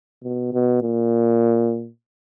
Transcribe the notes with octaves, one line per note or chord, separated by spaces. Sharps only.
B2
B2
A#2